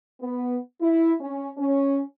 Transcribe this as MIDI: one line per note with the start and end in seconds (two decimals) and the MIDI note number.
0.21 0.58 59
0.81 1.13 64
1.21 1.51 61
1.58 2.02 61